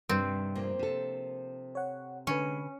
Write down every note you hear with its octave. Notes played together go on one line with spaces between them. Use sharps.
G2 C3 D#3 G3 C4
F3 A#3
C3 A4
C#5 F#5
D3 G#3 C#4 G#4 B4